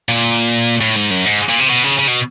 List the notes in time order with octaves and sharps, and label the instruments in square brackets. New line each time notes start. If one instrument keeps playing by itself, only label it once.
[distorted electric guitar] A#2
A2
G#2
F#2
G#2
A#2
C3
B2
C#3
C#3
B2